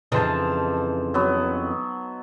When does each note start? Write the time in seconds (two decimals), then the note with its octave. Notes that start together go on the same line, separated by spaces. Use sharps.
0.12 F2 C#3 E3 D#4 C5 A5
1.14 F#3 B3